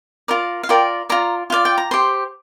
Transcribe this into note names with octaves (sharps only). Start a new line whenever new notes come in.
F4 A#4 D5
F5
F4 A#4 D5 G5
F4 D5 A#5
F4 D5 F5
G5
A#5
G4 C5 C6